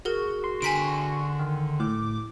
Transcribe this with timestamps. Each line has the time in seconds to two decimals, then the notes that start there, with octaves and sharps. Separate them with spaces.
0.05 F#4 G#4 A#4
0.44 C6
0.62 D3 G#5 A#5 B6 D7
1.39 D#3
1.80 A2 D6